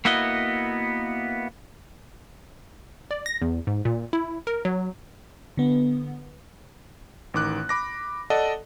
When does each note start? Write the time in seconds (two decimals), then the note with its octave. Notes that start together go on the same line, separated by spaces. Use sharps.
0.05 A#3 B3 E4 F#4 D#5
3.11 D5
3.26 A#6
3.42 E2
3.67 G#2
3.85 A#2
4.13 E4
4.47 A#4
4.65 F#3
5.57 D3 B3
7.34 A1 D#3 D6 F#6
7.69 B5 D6 A#6
8.30 A4 D5 D#5 F#5 A5